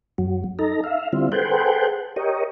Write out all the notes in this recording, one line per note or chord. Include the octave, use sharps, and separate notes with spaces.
F#2 F#3
D#4 A4 A#5
E5 F5
D3 G3 C4 E4 F4
G#4 A4 B4 C5 F#5 G5
G4 A#4 C#5 D#5